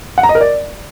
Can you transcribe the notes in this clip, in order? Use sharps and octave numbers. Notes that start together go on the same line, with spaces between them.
F#5
A#5
D#5
A#4
D5